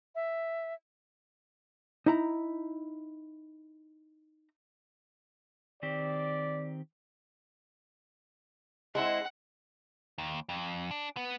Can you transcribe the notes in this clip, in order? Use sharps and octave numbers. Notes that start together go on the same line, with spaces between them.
E5
D#4 E4 A#5
D#3 C4 G4 D5
G#3 C4 E4 F#5
D#2
F2
D4
B3